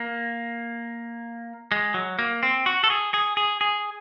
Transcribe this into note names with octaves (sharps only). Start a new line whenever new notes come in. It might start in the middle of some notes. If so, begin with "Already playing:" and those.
Already playing: A#3
G#3
F#3
A#3
C4
F#4
A4
G#4
G#4
G#4
G#4